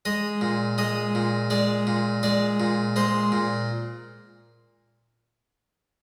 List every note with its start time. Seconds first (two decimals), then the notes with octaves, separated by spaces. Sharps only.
0.05 G#3 D#5
0.41 A#2
0.78 G#3 D#5
1.15 A#2
1.50 G#3 D5
1.87 A#2
2.23 G#3 D5
2.60 A#2
2.96 G#3 C5
3.32 A#2